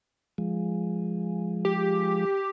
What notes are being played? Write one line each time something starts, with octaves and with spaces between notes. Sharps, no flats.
F3 G#3
G4